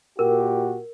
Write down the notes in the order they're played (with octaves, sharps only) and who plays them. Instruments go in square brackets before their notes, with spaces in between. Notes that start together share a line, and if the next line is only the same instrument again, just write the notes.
[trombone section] A#2 F#4 G4 [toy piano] A#4